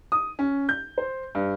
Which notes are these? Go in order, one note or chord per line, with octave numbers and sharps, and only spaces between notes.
D#6
C#4
G6
C5
G2